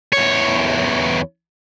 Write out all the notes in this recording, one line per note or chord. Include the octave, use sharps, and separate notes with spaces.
E2 C#5